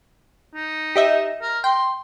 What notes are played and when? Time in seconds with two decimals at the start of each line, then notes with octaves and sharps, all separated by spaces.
0.55 D#4
0.96 G4 D#5 E5
1.42 A#4
1.64 G5 C6